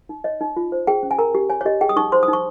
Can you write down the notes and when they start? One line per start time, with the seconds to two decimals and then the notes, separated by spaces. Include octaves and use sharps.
0.09 D#4
0.24 C#5 D#5
0.41 D#4
0.56 F4
0.72 C5
0.87 G#4 G5
1.03 C#4
1.11 G#5
1.18 A#4 A#5
1.35 G4
1.49 C#5 G#5
1.61 C#5
1.66 G4 D#5
1.81 G#4 G5
1.89 D#6
1.96 D#4 C#6
2.12 C5 C6
2.23 D#6
2.28 D#4
2.33 C#6